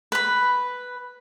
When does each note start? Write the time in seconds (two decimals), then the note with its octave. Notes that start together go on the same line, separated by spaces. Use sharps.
0.12 B4 B5